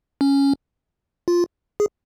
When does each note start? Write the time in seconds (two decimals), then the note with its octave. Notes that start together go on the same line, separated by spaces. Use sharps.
0.21 C#4
1.28 F4
1.80 G#4